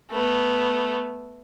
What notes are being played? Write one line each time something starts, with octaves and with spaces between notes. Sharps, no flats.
A3 B3